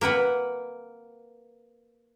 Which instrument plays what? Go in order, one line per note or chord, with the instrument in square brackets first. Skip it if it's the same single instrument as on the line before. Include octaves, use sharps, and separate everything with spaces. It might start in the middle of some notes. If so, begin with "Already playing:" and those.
[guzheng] A#3 B4 F#5 B5